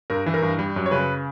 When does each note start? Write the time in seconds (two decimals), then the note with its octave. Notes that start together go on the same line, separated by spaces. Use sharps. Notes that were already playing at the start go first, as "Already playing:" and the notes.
0.10 G2 A#4
0.26 E3
0.34 A#4
0.42 G2
0.59 G3
0.76 F#2
0.86 C#5
0.91 C#3 B4